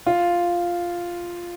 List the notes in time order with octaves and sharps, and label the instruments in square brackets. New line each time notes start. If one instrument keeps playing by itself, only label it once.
[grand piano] F4